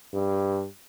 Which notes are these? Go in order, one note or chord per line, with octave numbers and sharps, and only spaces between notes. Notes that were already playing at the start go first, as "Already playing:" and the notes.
G2